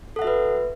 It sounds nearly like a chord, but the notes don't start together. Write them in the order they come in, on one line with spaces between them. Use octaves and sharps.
A4 F#5 E5 F#4 B4